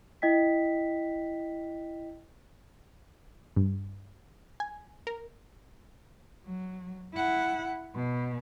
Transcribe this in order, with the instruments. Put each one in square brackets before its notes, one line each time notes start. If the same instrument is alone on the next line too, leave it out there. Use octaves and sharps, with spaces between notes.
[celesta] E4 D#5 G5 B6
[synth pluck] G2
G#5
A#4
[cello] F#3
E4 F#5
B2